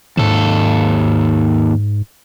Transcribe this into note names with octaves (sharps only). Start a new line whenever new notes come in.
D#2 G#2 A4